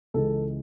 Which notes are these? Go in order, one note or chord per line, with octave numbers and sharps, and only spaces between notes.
C#2 C#3 E3 G#3 A4